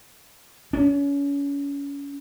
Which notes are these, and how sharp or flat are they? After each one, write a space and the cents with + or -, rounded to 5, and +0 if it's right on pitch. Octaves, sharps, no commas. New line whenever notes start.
C#4 +30